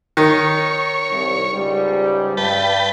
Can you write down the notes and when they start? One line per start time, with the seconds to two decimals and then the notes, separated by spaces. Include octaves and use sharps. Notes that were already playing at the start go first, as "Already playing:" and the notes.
0.17 D#3 C#5
1.11 C2
1.53 C#2 G#2 G3
2.37 G2 B4 G5 A5